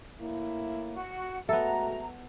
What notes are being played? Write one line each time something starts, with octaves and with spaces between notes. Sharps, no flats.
A2 A#3 E4
F#4
G#3 A3 B3 F#4 A4 E5 A#5